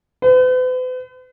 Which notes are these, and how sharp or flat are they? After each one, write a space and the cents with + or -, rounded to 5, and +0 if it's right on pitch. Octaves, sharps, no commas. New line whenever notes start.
B4 +45